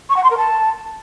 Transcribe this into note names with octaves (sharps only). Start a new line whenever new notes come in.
C#6
F#5
C6
A#4
A5